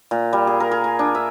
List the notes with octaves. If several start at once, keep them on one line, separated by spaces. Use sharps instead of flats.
A#2
G3
G#4
A#4
G#4
G#5
D4
E5